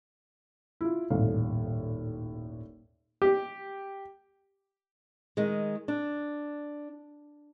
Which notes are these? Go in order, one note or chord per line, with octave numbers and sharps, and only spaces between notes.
E4 F4
D#1 G#1 A2 F5
G4
D#3 G#3
D4